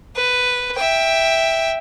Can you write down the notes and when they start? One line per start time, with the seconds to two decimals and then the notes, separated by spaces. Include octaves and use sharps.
0.16 B4
0.75 E5 G5